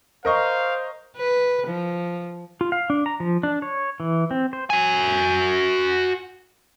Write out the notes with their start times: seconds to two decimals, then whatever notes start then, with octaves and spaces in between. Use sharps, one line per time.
0.25 A#4 C5 D#5 F5 C#6
1.16 B4
1.67 F3
2.61 F4
2.72 F5
2.90 D4
3.06 A#5
3.20 F3
3.43 D4
3.62 C#5
4.00 E3
4.31 C4
4.53 C5
4.70 F#4 G#5